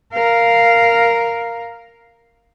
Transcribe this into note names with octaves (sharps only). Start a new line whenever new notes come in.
A#4 F5